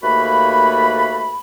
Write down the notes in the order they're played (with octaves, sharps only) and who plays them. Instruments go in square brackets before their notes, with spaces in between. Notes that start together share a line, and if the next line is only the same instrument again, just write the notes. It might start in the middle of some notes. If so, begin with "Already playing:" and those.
[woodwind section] D#2 A3 A#3 F#4 B4 B5